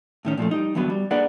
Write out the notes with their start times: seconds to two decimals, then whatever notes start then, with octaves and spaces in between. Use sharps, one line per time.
0.25 A2 D#3 C#4
0.37 A#2 F3 F#3 A3
0.51 G3 D#4
0.75 E2 G2 D3 F#3 B3
0.90 G3
1.11 A#3 D4 G#4 B4 D5 F#5